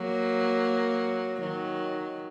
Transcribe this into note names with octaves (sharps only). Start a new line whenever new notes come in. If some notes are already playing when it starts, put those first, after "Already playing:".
Already playing: F#3 A#3
D#3 F#3